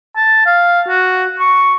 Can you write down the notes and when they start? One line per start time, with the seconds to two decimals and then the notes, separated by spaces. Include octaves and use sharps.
0.16 A5
0.46 F5
0.89 F#4
1.40 C#6